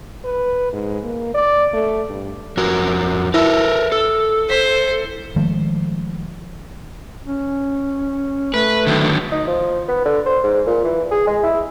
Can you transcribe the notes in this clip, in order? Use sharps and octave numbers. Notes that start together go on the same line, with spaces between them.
B4
G#2
A#3
D5
A3
G2
F2 F#4 A#4
E4 A#4 B4 A5
A4
C5 B6
D#3 F3 G#3 A3
C#4
A3 B4
D3 D#3 F#3
D#4
F3
B3
D3
C5
G#2
A#2
E3
G#4
G#3
E4